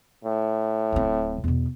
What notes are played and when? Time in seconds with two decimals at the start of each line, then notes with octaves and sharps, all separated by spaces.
0.24 A2
0.92 D1 C4
1.44 E2 B2